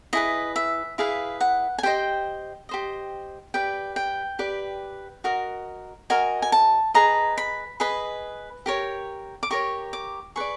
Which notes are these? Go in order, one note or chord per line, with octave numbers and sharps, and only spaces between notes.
E4 G#4 B4 D#5
E5
E4 G#4 B4 F5
F#5
G#5
G4 C5 D#5 G5
G4 C5 D#5
G4 B4 D5 G5
G5
G4 B4 D5
F#4 A#4 D#5
F#4 A#4 D#5 G#5
G#5
A5
G#4 B4 D#5 A#5
B5
G#4 B4 D#5 B5
G4 A#4 C#5
D6
G4 A#4 C#5 C#6
D6
G#4 B4 D5 C#6